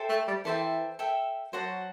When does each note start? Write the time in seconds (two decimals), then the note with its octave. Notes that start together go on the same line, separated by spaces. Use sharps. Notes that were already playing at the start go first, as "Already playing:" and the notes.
Already playing: A4 C5 E5 G5
0.09 A3
0.27 G3
0.45 E3 A4 C5 E5 G5
0.99 A4 E5 G5
1.53 F#3 F#4 C5 F#5 A5